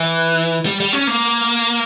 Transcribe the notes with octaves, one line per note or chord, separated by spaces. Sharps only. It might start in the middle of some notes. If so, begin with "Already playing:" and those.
Already playing: E3
G3
G3
C#4
A#3